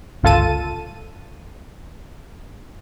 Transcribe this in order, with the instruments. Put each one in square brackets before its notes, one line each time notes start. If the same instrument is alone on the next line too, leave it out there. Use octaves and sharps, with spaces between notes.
[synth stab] G1 C#2 F4 A4 A5 D#7